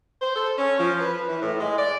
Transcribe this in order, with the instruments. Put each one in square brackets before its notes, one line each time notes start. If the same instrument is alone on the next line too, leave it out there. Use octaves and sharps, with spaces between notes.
[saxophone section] C5
A4
C#4
F3
B4
E3
A2
G#3
D5